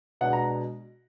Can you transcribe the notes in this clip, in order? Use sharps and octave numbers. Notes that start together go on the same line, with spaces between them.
B2 G#3 D4 F#5
A#5